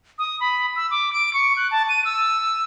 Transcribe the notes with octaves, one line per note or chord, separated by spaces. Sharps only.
D#6
B5
E6
D6
D7
C#6
F#6
A5
D#7
E6